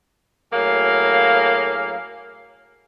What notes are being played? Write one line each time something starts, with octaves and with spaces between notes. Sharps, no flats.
A2 F#3 A#3 G#4 F5